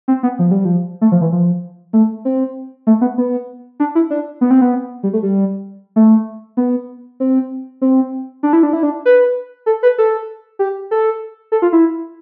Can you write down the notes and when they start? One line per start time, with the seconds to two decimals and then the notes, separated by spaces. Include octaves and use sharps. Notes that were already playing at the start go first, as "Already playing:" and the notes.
0.08 C4
0.23 B3
0.39 F3
0.51 G3
0.65 F3
1.01 A3
1.12 F3
1.21 E3
1.32 F3
1.93 A3
2.25 C4
2.87 A3
3.01 B3
3.18 B3
3.80 D4
3.95 E4
4.10 D4
4.41 B3
4.51 C4
4.61 B3
5.03 G3
5.13 A3
5.23 G3
5.96 A3
6.57 B3
7.20 C4
7.82 C4
8.43 D4
8.53 E4
8.63 D4
8.73 E4
8.83 D4
9.06 B4
9.66 A4
9.83 B4
9.98 A4
10.59 G4
10.91 A4
11.52 A4
11.62 F4
11.73 E4